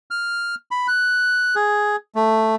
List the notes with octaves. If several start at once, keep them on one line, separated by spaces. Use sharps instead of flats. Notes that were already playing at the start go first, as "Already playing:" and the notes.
F6
B5
F#6
G#4
A3